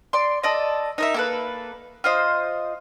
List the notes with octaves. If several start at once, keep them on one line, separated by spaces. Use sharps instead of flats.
D5 C6
A4 D5 D#5
D#4 A#4 E5
A#3 A4 B4
F4 C5 D#5